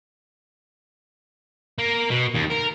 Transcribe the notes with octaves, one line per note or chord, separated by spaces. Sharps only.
A#3
B2
D#2
A#4